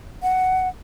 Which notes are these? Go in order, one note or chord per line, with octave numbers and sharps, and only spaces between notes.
F#5